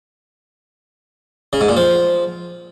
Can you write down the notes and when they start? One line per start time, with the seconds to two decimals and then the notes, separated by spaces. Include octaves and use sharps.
1.53 C#3
1.61 G#2
1.69 A#2
1.77 F3